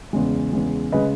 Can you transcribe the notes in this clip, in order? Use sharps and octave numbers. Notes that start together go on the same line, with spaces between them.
E2 C#3 G#3
E2 C#3 G#3
C#3 G#3 B4 D#5